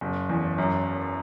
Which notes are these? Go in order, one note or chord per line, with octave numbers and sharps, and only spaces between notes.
F#1
E2
F#2